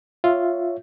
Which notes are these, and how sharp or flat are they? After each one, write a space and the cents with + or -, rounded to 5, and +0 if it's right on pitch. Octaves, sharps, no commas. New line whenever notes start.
F4 +0 C#5 +0 E5 +5